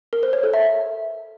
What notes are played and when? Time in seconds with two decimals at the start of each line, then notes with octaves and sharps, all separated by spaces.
0.13 A#4
0.23 C5
0.33 C#5
0.43 A4
0.53 E5